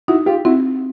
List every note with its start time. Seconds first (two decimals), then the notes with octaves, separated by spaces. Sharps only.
0.08 D#4 E4 F#4
0.26 F4 G4
0.45 C4 E4 F#4